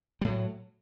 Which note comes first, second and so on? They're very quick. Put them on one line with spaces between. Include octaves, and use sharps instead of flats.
G3 A2 F#3